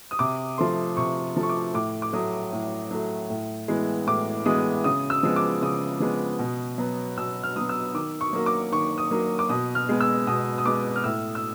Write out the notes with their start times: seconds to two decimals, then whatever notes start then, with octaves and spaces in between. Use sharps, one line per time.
0.11 D#6
0.19 C3 D6
0.58 F3 A3 C6
0.97 C3 C#6
1.36 F3 A3
1.43 C#6
1.49 D6
1.74 A2 D6
2.02 D6
2.13 F#3 A3 D#6
2.53 A2
2.91 F#3 A3
3.30 A2
3.68 E3 G#3 B3
4.07 A2 D6
4.46 E3 G#3 B3 D#6
4.84 C#3 D#6
5.10 E6
5.23 F3 G#3 B3
5.36 D6
5.62 C#3 D#6
6.00 F3 G#3 B3
6.39 B2
6.78 F#3 B3
7.17 B2 E6
7.43 F6
7.56 F#3 B3 D#6
7.69 E6
7.94 D#3 D6
8.21 C#6
8.33 F#3 A#3
8.46 D6
8.72 D#3 C#6
8.98 D#6
9.11 F#3 A#3
9.39 D6
9.50 B2 D#6
9.75 F6
9.89 G#3 B3
10.01 E6
10.27 B2 D#6
10.58 D#6
10.65 G#3 B3 D6
10.96 F6
11.04 A2 E6
11.35 E6